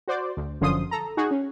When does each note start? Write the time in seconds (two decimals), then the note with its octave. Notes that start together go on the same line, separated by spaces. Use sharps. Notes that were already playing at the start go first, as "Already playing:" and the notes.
0.08 F#4 C5 D5
0.37 D2
0.61 G1 F#2 D3 F3 C6 D#6
0.91 A4 A#5
1.17 D#4 F#4 G#4
1.31 C#4